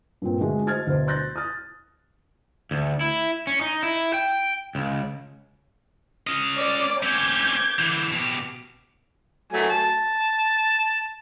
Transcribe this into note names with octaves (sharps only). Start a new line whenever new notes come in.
G2 A#2 C4
D3 G#3 A3 F#4 G#4
C5 D#5 F6 G#6 A6
D2 B2 C5
C6 F#6 G6 A6 A#6
D#6 F6 A6
D2
E4
C#4
D#4
E4
G5
C#2
C#4 D#5
C#5 D5 D6
C4 C#4 D6 G6 G#6
D3 E3
B2 G4
F#3 A3 G#5
A5